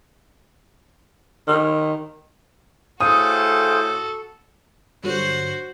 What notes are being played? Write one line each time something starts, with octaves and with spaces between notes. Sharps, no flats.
D#3
A2 F#4 G#4 A4 C5 F5 D#6
G2 D3 F#3 F#4 C5